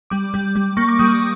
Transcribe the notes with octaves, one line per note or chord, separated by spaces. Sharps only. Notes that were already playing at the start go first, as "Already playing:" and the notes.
G3 D6
G3
G3
A#3 C#6
D6
G3 D#6